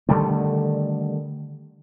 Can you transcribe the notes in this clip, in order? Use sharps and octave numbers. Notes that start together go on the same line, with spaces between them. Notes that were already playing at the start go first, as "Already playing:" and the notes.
D3 D#3 G3 A3